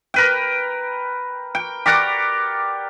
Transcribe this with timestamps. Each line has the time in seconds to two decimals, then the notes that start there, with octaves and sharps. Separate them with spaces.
0.14 A#4 B4 G5
1.55 G5
1.86 G4 A#4 D5 F#5